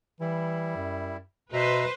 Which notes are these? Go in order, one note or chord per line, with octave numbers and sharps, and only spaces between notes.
E3 G3 E4
F#2
B2 B4 C5 E5 A#5